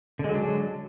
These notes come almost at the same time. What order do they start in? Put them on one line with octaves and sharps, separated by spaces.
D3 G#3 F#3 D4